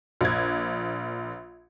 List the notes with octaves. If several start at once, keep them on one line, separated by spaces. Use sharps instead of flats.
A#1 G#6